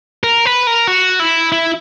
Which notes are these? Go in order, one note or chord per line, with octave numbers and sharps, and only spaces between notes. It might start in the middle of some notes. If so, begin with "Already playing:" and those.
A#4
B4
A#4
F#4
E4
E4